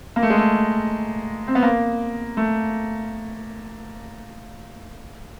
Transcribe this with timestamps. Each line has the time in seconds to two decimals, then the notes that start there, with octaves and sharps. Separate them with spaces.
0.16 A#3
0.23 A3
0.30 G#3
0.37 A3
1.48 C4
1.55 B3
1.63 A#3
2.37 A3